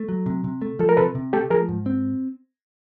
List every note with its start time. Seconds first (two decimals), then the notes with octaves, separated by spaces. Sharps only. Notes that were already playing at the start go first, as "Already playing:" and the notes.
Already playing: A3
0.09 F#3
0.26 C3
0.44 C3
0.62 A3
0.79 F3 A4
0.89 A#4
0.97 C3 A4 B4
1.15 C3
1.33 A3 G4 A4
1.50 F3 G#4 A#4
1.69 G#2
1.86 C4